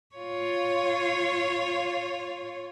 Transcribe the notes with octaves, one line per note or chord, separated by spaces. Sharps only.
F4 C#5